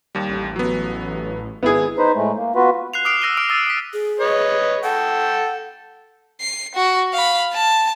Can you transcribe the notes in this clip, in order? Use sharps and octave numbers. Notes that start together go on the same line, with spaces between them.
D#2 G3
A1
F#3 B3
G#1 B3 E4 G#4
D#4 B4 C5
A2 G#3 A3
A#3
B3 F4 F#4 B4
F#6 C7 F7
D6 D#6 F6 C7 D7 F7
E6 F#6 A#6 D7 D#7 G7
D6 D#6 F6 D7
D#6 E6 A6 D#7
D#6 B6
G#4
B4 C#5 D#5
A4 F#5 G5
C7
F#4
F5 B5
A5